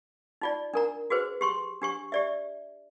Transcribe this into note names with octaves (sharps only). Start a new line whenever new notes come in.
D#4 F4 D5
D4 A#4 A#5
F#4 G#4 B4 C5
G4 C6 C#6
D4 G4 C#6
G4 D5 E5